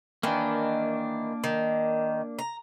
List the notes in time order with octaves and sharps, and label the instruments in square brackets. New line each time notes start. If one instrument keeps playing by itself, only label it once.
[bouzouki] D#3 E3 [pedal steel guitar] A#3 D4
[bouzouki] D#3
A#5